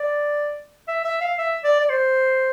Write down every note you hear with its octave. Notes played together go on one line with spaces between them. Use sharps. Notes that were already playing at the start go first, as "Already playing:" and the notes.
Already playing: D5
E5
E5
F5
E5
D5
D5
C5